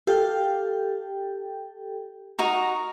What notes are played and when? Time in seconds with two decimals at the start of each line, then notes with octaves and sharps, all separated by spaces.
0.07 G4 A4 F5 G5
2.39 D#4 F#4 A#4 A#5